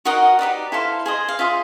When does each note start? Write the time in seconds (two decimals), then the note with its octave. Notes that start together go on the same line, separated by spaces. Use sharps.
0.05 D#4 F#4 A#4 D#5 F#5
0.39 D#4 G4 B4 D5
0.72 E4 A4 C5 F5
1.06 G#4 C5 D#5
1.29 F5
1.39 F4 G#4 C5 E5